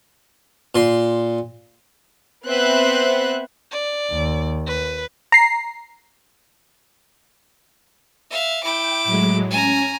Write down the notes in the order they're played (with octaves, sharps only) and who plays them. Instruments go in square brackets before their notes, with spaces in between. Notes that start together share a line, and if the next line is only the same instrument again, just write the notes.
[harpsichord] A#2 C6
[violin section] B3 C4 B4 C5 E5 F#6
[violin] D5
[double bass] D#2
[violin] B4
[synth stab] A#5 C7
[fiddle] E5 F5
[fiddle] E4 D6 [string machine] G5
[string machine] A2 F#3 G#3
[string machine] C#4 [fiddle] G#5 A#5